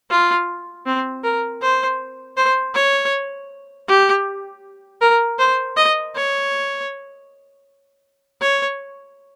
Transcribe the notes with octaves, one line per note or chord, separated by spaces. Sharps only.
F4
C4
A#4
C5
C5
C#5
G4
A#4
C5
D#5
C#5
C#5